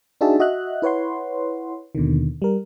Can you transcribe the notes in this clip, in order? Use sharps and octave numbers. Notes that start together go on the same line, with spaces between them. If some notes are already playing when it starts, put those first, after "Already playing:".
D4 D#4 F#4 G#4 E5 A5
F#4 D#5 E5 F#6
E4 B4 C#5 F#5 C6
D#2 B2 D3 D#3
G3 A#4